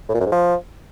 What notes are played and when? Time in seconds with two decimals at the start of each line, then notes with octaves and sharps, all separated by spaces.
0.09 A2
0.15 A#2
0.20 F#2
0.26 G#2
0.32 F3